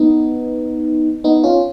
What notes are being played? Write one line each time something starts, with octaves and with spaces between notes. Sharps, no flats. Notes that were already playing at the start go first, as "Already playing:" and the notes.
Already playing: B3 D#4
B3 D#4
C#4 F4